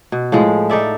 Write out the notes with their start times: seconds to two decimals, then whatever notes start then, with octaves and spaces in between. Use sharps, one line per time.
0.12 B2
0.32 A2 F3 G#3
0.70 D#4 A4 D5 E5